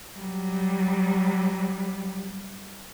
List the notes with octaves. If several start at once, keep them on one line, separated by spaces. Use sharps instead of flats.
F#3 G3